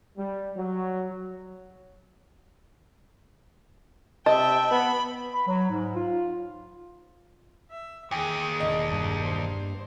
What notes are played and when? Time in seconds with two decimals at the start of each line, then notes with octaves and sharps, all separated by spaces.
0.18 G3
0.57 F#3
4.26 C3 D#5 E5 G5 A5
4.71 B3 B5
5.33 B5
5.47 F#3
5.69 G#2
5.96 F4
7.70 E5
8.11 D#2 G#4 G5 G#5 D#6
8.60 E1 D#5
8.92 G2
9.24 C5